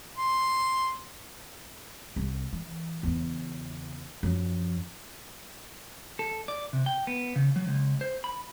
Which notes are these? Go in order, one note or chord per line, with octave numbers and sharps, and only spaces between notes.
C6
C2
E3
E2 C#3
F#2 F3
A4
D5
C3
G5
B3
C#3
F#3
C#2
C5
B5